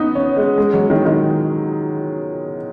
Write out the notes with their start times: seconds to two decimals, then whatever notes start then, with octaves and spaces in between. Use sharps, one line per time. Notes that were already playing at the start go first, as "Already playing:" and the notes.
Already playing: B3 C#4 D#4
0.15 C#4
0.37 G#3
0.58 G#3
0.74 F#3
0.90 D#3
1.05 D#3